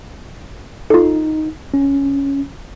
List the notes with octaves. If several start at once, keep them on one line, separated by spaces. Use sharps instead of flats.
D#4 F4 A4
C#4